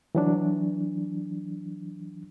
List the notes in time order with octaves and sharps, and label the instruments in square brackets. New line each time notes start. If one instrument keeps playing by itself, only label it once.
[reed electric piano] E3 F#3 D4